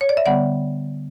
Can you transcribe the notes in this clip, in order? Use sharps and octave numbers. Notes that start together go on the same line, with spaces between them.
C#5
D5
E5
D3 G3 B3 D5 F#5